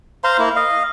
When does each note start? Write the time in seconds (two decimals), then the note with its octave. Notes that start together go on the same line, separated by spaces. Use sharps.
0.24 C5 F5 A#5 C6
0.38 A#3 E4
0.56 D#5 F5